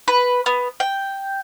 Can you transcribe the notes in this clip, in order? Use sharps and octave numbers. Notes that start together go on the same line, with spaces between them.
B4
B3
G5